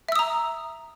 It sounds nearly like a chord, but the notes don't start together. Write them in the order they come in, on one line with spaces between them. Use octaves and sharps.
E5 E6 D#6 A#5